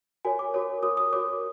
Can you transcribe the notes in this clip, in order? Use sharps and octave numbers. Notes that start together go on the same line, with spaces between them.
F#4 A#4 C#5 G#5
D6
F#4 A#4 C#5
F#4 A#4 C#5 D#6
D#6
F#4 A#4 C#5 D6